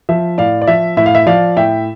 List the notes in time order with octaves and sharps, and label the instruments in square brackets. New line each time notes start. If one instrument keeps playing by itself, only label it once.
[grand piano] F3 E5
A2 D5 F5
D5
F3 E5
A2 E5
F5
E5
F3 D5 F5
A2 E5 G5